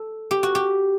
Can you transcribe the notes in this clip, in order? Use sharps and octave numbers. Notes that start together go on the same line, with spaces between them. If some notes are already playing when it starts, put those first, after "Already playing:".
Already playing: A4
G4
F#4
G4